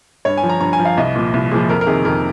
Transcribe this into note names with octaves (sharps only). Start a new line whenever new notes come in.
G2 C#5
G#5
F3
A#5
G2 A#5
G#5
F3
F5
C2 D#5
A#2 F3
C2
A#2 F3 G#4
F2 A#4
A#4
C3 D#3 G#4
F2 A#4